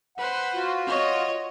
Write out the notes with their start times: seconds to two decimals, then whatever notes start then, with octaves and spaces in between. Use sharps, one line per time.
0.18 B4 C5 F#5
0.54 F4 F#4
0.87 C#5 D#5